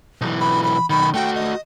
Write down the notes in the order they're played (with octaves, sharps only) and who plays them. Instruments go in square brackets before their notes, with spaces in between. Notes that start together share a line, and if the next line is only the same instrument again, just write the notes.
[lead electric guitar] B1 E3
[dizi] B5
B5
[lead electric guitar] B1 D#3 [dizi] B5
[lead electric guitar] A3 F#4 [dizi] G5
[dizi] D#5